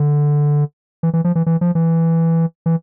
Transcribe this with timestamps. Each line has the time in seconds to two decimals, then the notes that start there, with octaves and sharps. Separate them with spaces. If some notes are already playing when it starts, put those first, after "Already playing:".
Already playing: D3
1.03 E3
1.13 E3
1.24 F3
1.35 E3
1.46 E3
1.61 F3
1.75 E3
2.66 E3